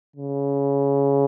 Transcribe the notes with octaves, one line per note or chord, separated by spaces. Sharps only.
C#3